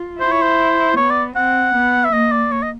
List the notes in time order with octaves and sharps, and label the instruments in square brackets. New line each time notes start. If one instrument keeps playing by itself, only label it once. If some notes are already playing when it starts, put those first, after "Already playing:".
Already playing: [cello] F4
[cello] E4 [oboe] C5
[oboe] C#5
C5
[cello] B3 [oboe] C#5
[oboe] D5
[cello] C4 [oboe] F#5
[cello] B3
[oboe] E5
[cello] A#3 [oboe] D#5
[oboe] D5
C#5
D#5